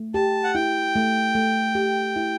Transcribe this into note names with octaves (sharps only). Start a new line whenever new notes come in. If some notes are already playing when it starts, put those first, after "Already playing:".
Already playing: A3
G4 A5
F#5
E4 G5
A3
A3
G4
E4